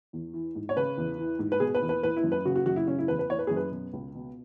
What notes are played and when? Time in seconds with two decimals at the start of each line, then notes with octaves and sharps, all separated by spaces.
0.13 E2
0.34 E3
0.55 G#2
0.69 C#5
0.76 C#3 B4
0.97 E2
1.18 E3
1.39 G#2
1.52 B4
1.60 B2 G#4
1.75 B4
1.82 E2
1.89 B4
2.03 E3 B4
2.17 E4
2.23 F#2
2.32 B4
2.45 C#3 F#4
2.55 F#4
2.66 F#2 F#4
2.76 E4
2.87 C#3 C#4
2.99 E4
3.08 E2 B4
3.19 B4
3.29 E3 C#5
3.39 B4
3.47 F#2 G#4
3.56 B4
3.71 B2
3.93 C#2
4.15 B2